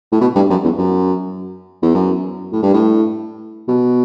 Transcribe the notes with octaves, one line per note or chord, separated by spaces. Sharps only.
A2
B2
G2
F#2
E2
F#2
E2
F#2
A2
G2
A2
B2